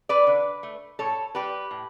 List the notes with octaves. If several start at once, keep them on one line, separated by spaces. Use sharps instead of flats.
B4 D5
D3
A3
A2 A4 C#5
G3 G4 B4
A2